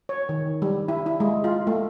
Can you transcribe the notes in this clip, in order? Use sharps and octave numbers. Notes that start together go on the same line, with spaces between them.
C#5
D#3
G3
E4
E4
G#3
F4
A3